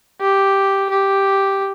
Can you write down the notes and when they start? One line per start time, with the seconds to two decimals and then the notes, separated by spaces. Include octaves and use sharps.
0.20 G4
0.90 G4